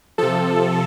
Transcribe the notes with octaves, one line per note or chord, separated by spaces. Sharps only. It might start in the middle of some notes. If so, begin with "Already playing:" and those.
C3 F3 A4